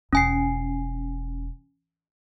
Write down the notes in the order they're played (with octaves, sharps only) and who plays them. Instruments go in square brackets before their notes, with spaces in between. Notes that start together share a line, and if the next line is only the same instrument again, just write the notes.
[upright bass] E1 [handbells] C#4 G#5 C7